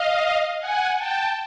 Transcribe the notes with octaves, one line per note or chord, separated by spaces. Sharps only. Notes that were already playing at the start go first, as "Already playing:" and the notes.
Already playing: D#5 F5
F#5 G#5
G5 A5